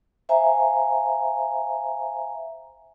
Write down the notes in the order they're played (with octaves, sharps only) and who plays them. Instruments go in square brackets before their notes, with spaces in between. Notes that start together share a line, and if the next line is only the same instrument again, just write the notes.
[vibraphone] C5 E5 F5 G#5 A#5